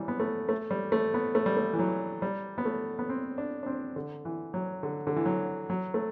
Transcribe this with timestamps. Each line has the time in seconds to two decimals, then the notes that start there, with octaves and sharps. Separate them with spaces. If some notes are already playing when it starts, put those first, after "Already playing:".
Already playing: E3 F#3 G3
0.08 B3
0.20 A3
0.49 A3
0.71 G3
0.92 A3
1.14 B3
1.35 A3
1.46 G3
1.57 A3
1.73 E3
1.79 F#3
2.22 G3
2.58 B3
2.65 A3
2.99 B3
3.09 C4
3.38 D4
3.63 D4
3.66 C4
3.96 D3
4.25 E3
4.54 F#3
4.83 D3
5.07 D3
5.16 E3
5.26 F#3
5.70 F#3
5.94 A3